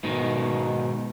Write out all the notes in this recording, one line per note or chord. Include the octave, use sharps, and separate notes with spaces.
G#2 B2 D#3